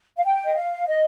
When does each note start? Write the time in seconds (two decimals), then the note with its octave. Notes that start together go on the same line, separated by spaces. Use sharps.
0.18 F5
0.25 G5
0.44 D#5
0.56 F5
0.87 D#5